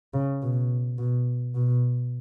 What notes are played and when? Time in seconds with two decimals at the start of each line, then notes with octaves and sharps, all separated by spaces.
0.14 C#3
0.42 B2
0.99 B2
1.55 B2